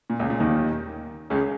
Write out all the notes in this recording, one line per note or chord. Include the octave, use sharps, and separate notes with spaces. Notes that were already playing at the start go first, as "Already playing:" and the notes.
A#2
C#2 C#3
A#2
D#2 D#3
C#2 C#3